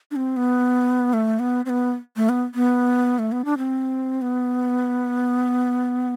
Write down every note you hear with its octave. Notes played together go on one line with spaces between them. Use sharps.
D4
C4
B3
A3
B3
C4
B3
A3
B3
B3
A3
B3
D4
C4
B3